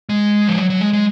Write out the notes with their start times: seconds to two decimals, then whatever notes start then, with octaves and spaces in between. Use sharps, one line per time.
0.09 G#3
0.47 F3
0.58 F#3
0.70 F#3
0.81 G#3
0.93 G#3